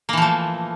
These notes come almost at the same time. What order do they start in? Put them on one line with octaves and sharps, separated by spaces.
A#3 E3 F3 A3